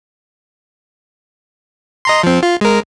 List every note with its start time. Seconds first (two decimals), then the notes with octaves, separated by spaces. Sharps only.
2.05 D#5 A#5 C6
2.23 F3 C4
2.43 F4
2.61 G#3 A#4